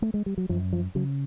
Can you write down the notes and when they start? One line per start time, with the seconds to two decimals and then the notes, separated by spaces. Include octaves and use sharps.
0.02 A3
0.14 G#3
0.26 G3
0.38 F#3
0.49 F#2 F3
0.73 F3
0.95 C#3 F#3